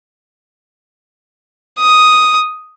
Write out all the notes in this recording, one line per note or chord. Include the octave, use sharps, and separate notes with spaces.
D#6